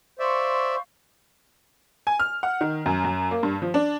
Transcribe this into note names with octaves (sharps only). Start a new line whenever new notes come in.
C5 D5 E5 F5 C6 C#6
G#5
F6
F#5
D#3
F#2
F#2
A#3
G2
F3
D4